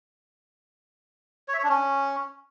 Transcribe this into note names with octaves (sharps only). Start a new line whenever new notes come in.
C#5
E5
C#5
D4
C#4